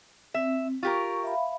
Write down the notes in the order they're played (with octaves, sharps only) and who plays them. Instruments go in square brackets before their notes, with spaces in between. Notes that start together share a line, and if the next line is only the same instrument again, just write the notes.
[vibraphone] C4 [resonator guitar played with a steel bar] E5
[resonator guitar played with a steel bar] F4 G4 A#4 [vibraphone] C#6
[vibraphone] E5 F5 B5